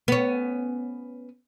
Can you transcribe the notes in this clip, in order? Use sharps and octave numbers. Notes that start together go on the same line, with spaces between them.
B3 C#4